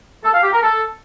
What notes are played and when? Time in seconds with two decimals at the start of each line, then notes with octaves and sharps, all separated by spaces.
0.24 A4
0.34 F5
0.43 G4
0.53 A#4
0.62 A4